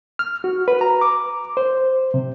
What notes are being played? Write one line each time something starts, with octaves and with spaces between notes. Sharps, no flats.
F6
F#4
B4
A#5
D6
C5
C3